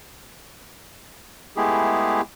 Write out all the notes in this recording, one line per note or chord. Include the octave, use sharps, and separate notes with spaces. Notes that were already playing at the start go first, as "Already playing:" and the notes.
G#3 A3 B3 E4 G4 G#4